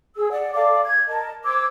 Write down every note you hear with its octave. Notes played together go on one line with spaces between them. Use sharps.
G#4 E6
D5 F#5
A4 D5 F5 D6
G#6
A#4 D#5 A5
C5 D6 E6 G#6